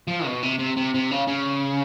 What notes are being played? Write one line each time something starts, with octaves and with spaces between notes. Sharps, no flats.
F3
B2
C3
C3
C3
C3
C#3
C#3